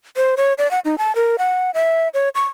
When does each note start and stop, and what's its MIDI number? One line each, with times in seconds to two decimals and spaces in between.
0.17 0.35 72
0.37 0.53 73
0.58 0.70 74
0.71 0.80 78
0.85 0.98 63
0.98 1.14 81
1.15 1.36 70
1.38 1.71 78
1.74 2.08 76
2.14 2.29 73
2.35 2.45 85